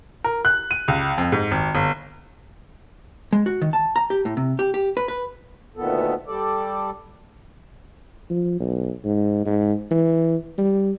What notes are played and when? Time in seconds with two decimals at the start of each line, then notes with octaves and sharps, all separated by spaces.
0.24 A#4
0.45 F#6
0.71 D#7
0.88 C#2
1.18 F2
1.32 G#2
1.51 G#1
1.75 G1
3.33 G#3
3.46 F#4
3.61 D#3
3.73 A5
3.96 A#5
4.10 G4
4.25 A2
4.37 C3
4.59 G4
4.74 G4
4.97 B4
5.08 B4
5.76 D2 A#2 D#3 B3 A4
6.27 G3 A4 D5
8.30 F3
8.60 B1
9.04 G#2
9.45 G#2
9.91 E3
10.58 G3